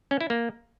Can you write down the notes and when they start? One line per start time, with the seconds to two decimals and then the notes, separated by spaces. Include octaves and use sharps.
0.11 C#4
0.21 E4
0.30 A#3